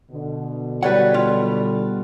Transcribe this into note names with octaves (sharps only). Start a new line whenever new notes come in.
B2 D3
F#3 G3 B4 F#5
G3 F4